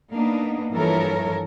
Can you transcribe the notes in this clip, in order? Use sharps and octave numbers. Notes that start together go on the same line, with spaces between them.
A#3 B3 D4 D#4
G2 E3 F3 A4 A#4 C#5